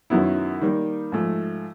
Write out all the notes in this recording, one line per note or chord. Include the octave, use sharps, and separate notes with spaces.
F#2 D#3 F#3 B3 E4
D#3 G3 A#3
G#2 F3 A3